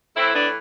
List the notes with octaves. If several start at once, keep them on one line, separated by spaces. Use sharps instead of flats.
A2 E3 C4 E4
B3 D4